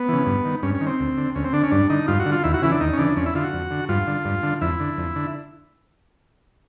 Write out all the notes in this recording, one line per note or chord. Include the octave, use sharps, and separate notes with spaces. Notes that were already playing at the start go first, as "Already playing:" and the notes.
Already playing: B3
C#3 E3
G2
D#3
G2 C#4
C#4
D#3
C4
D2
D3
D2 C#4
C4
D3 D4
C#4
G2 D4
D3 D#4
G2 F4
F#4
D3
F4
D#2 E4
F#4
C#3 E3 E4
D4
D#2 D#4
C#4
C#3 E3 D4
F2 C#4
E4
D3 F4
F#4
F2
D3
G2 F4
D3
G2
D3
F2 E4
D3
F2
D3